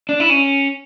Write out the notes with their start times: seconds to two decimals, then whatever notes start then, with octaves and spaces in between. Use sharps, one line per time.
0.09 D4
0.20 E4
0.30 C#4